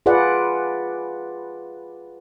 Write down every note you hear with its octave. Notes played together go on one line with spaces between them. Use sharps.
F4 G#4 B4 D5 F#5